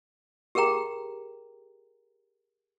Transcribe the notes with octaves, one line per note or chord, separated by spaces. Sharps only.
G4 G#4 A#4 G5 A#5